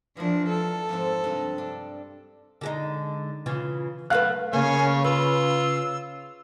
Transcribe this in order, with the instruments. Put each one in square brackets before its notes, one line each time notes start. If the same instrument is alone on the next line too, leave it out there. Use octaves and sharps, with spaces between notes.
[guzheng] E3 A#4 [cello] F3 D4
[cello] A4
[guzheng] F2 G#2 C4
G2 C3 D#5
D4
[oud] D3 G#3 D#4
C#3 E3 F4
[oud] F#3 A3 B4 [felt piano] F5 F#6
[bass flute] C#3 [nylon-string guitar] A#3 [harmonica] C#5 F5 [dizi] G#5
[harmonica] F4 [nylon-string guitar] B4 [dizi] E6